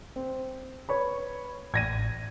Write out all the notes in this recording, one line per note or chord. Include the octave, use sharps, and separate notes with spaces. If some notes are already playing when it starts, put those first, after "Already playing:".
C4
B4 C#5 B5
A1 G#6 A#6 D#7